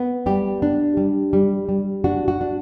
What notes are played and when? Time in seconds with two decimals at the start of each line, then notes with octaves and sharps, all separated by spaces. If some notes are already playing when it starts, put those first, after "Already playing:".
Already playing: B3
0.26 G3 G4
0.62 D4
0.97 G3
1.33 G3
1.69 G3
2.04 D4 F#4
2.28 F#4
2.41 D4